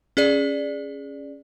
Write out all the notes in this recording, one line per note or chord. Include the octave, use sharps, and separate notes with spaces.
C#4 G#4 D5